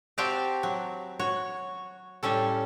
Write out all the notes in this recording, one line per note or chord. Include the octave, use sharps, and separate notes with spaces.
C4 F#4 G4 F5 G5 A5
F#3
F#4 C#5
A2 G3 C#4 A4